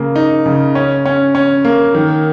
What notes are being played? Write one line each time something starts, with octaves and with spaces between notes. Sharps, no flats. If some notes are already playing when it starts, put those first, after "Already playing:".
Already playing: C#3 A#3
D#4
C#3
C#4
C#4
C#4
A#3
D#3